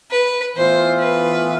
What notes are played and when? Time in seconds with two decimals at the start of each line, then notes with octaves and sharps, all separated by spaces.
0.11 B4
0.56 A2 E3 B3 F4 C5
1.00 B4